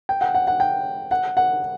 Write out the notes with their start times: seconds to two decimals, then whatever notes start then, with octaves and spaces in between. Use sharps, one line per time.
0.09 G5
0.21 F#5
0.34 F#5
0.47 F#5
0.60 G5
1.11 F#5
1.37 F#5